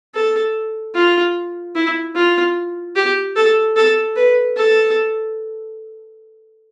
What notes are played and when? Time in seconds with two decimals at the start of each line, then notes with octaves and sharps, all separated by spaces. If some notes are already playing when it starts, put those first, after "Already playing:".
0.15 A4
0.95 F4
1.76 E4
2.15 F4
2.96 G4
3.36 A4
3.76 A4
4.16 B4
4.56 A4